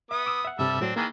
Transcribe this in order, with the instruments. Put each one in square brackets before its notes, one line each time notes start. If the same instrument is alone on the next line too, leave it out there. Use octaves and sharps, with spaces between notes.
[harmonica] B3 D#6 [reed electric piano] E5
[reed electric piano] D6 E6
E5 F#5
[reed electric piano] G2 C3 [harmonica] G3 A4 E5
[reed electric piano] A2 F#3 [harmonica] C4 D4
[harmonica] D#3 E3 G#3 [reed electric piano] A#3